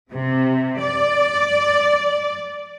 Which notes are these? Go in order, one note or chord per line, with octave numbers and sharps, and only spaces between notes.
C3
D5